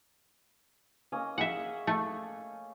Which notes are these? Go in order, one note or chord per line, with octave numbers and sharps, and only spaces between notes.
A#3 C#4 D#5
G#4 D#5 E5 F#5
A3